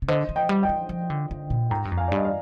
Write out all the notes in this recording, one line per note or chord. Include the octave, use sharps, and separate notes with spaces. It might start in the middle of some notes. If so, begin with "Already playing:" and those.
C3
D3 C5 D#5
F3
D#5 G5
G3
D#5 G5
F3
F3
D3
D3
A#2
G#2 G5 A#5
G2
F2
F5 G#5
D5
G2
D#5
D5 F5